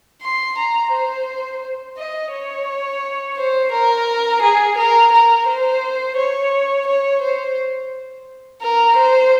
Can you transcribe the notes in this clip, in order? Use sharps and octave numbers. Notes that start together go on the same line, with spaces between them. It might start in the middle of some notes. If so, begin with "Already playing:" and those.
C6
A#5
C5
D#5
C#5
C5
A#4
G#4
A#4
A#4
C5
C#5
C#5
C5
A#4
C5